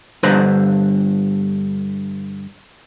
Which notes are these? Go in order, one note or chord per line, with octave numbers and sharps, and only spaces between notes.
G2 D3 B4 C5 A#5 C6